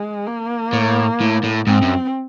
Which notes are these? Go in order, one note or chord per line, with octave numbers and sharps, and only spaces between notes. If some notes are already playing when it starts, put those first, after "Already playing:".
Already playing: G#3
A#3
A2
A2
A2
G#2 C4
F#2